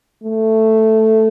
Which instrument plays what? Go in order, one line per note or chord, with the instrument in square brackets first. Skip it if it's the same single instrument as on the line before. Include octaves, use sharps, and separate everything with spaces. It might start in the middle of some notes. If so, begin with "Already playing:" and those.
[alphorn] A3